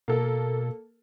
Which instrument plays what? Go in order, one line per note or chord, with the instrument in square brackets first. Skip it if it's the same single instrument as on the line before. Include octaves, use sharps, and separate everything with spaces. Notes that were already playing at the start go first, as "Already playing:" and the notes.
[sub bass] B2 [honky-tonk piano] A#3 A4